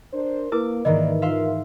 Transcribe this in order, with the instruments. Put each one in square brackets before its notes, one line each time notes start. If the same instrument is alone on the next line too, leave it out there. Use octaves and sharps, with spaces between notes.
[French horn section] D4 A#4 C5
[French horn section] A#3 [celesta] E4 A#4 B4 [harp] D6
[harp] G#2 D#3 E3 [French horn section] A#3 D#4 D5 [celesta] D#5
[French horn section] D#4 F4 A#4 [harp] E5 F5 C6